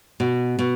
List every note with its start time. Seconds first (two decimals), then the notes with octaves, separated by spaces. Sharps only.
0.20 B2
0.59 B2